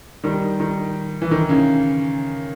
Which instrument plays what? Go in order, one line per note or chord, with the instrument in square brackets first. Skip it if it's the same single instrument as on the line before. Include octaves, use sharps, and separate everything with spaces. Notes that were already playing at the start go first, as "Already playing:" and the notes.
[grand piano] D#3 G3
D#3
E3
D#3
C#3